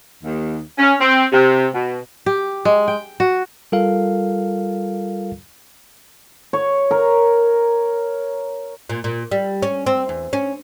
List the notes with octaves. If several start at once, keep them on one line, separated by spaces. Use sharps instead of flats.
D#2
C#4
C4
C3
B2
G4
G#3
G5
F#4
G3 F4 A4 A#4 F5
C#5
A#4
A#2
A#2
G3
C#4
C4
E2
C#4